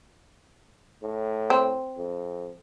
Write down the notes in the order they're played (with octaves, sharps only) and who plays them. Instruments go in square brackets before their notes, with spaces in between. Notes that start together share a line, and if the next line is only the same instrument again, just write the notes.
[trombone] A2
[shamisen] C4
[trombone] F2